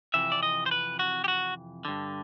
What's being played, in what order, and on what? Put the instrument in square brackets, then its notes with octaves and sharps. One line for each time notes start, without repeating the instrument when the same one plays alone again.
[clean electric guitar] F2 C3 E3 E5
D5
D#5
C5
B4
F#4
G4
F#4
G2 D3